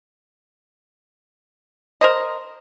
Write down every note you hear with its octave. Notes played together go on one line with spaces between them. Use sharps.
A#4 C5 D#5